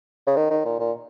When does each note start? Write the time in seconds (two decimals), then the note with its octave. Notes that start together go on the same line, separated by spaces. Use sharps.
0.27 C#3
0.37 D#3
0.51 D#3
0.65 A#2
0.79 A#2